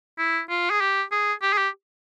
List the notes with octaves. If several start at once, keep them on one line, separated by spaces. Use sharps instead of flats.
E4
F4
G#4
G4
G#4
G4
G#4
G4